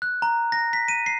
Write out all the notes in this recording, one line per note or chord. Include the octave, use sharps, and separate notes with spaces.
F#6
A#5
A#6
B6
D#7
C7